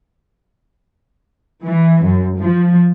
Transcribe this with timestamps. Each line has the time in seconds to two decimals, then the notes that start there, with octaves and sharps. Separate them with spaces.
1.65 E3
2.04 F#2
2.38 F3